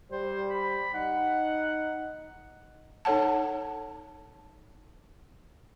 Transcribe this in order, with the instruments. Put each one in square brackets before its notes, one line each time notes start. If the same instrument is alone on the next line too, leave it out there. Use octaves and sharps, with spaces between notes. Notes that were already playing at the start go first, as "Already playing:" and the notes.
[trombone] G3 [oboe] C5
[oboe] B5
[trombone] D#4 [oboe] F#5
[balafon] D#4 A4 C#5 F#5 A5